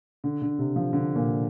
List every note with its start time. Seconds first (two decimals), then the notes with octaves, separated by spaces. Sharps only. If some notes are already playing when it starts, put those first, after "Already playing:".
0.24 D3
0.42 D3
0.59 C3
0.76 F3
0.93 D3
1.16 A#2